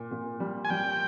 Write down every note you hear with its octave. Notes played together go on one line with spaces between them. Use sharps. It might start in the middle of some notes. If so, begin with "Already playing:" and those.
Already playing: A#2
A#2
G3
G#5
G3 G5